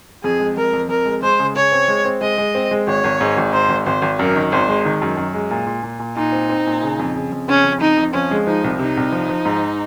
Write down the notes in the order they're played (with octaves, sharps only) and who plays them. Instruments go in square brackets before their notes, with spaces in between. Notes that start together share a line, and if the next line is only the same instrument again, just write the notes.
[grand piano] F2 [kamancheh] G#4
[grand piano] G#3
[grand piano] F2 [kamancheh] A#4
[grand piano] F2
[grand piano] F2 [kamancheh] A#4
[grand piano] G#3
[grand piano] G#3 [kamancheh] C5
[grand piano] C#3
[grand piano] C#3 [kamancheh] C#5
[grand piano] C4
G#3
C4
[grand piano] G#3 [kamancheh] D#5
[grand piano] G#3
C4
G#3
[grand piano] G#1 [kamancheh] C#5
[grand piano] G#1
G#2
G#1
[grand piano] G#2 [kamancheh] C5
[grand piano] G#1
[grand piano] G#1 [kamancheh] C5
[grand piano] G#1
[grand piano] F#2 [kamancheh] A#4
[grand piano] D#3
[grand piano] G#1 [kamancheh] C5
[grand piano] G#3
D#3
F#2
F#2
G#3
A#2
A#2
A#2
A#2
[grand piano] A#2 [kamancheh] D#4
[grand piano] C4
C4
A#2
C#3
F2
C#3
F2
[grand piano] C#3 [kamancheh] C#4
[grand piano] F2
[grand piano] F2 [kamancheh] D#4
[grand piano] F2
[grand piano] F3 [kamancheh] C#4
[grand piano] G#3
[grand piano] F3 [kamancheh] D#4
[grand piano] C2
[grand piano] C3 [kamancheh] D#4
[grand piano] C2
F3
F3
G#2